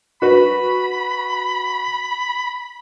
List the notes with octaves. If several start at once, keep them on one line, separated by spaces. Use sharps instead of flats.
F#4 B4 B5